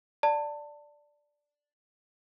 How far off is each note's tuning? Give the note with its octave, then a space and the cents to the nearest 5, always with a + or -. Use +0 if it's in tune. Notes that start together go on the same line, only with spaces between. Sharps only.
D5 +0 A5 +25